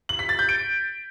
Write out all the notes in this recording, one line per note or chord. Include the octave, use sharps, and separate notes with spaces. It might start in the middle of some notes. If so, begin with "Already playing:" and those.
F#7
B6
A6
G6
D7